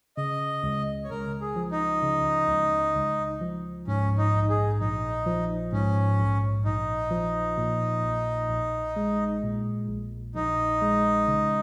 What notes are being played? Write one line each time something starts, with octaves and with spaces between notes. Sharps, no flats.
C#3 D#5
C#2
C#5
C#2 A#4
G#4
F3
D#4
C#3
C#2
C#2
F3
G#2 C#4
D#4
A#1
G#4
A#1 D#4
F3
G#2 C#4
A#1
A#1 D#4
F3
A#2
A#1
A#1
G#3
A#2
A#1
A#1 D#4
G#3
C#3